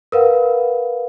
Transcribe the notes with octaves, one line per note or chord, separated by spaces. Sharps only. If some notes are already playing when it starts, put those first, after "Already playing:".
A#4 B4 F5 F#5